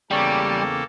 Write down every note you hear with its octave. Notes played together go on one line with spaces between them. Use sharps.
E2 C#3 G3 A#3 A4 G5 C#6 D6